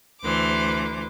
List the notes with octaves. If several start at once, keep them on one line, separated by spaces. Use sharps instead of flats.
D2 E3 C5 D6